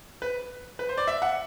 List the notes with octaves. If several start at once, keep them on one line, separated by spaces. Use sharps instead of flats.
B4
B4
C5
D5
E5
F#5